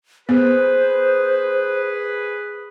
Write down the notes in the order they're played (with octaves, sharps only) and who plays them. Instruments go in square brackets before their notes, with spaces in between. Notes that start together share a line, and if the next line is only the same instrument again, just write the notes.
[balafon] B3 [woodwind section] G#4 B4 [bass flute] C5